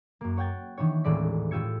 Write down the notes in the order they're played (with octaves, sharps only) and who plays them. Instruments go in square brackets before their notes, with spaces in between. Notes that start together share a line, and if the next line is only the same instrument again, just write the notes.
[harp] F#2 A#3
C#5 F#5 G5 G#6 A6
D#3 E3 D4 C#5
D#1 A1 A2 G#3 D5 B6
A2 F4 G4 E6 G#6 C#7